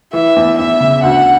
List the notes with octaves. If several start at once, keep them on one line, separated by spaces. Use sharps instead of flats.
E3 E5
E2
E2 E5
C#3
D2 F#5